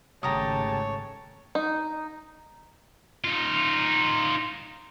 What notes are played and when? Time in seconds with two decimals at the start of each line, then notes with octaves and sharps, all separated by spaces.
0.23 G#1 C#3 A3 G4 C#5 A5 A#5 D#6
1.55 D#4
3.24 D#4 F4